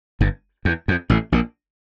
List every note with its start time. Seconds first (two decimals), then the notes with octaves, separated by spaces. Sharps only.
0.21 G1 G2
0.65 E2
0.88 F2
1.10 A1 A2
1.32 A#1 A#2